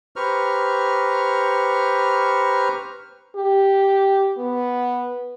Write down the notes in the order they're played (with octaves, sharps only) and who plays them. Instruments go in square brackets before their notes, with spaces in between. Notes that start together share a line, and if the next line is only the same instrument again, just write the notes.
[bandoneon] G4 B4 C5 A#5 C#6 F6
[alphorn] G4
B3